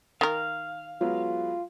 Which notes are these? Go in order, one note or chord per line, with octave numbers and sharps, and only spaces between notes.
D#3 A#4 F5
F#3 G#3 B3 F4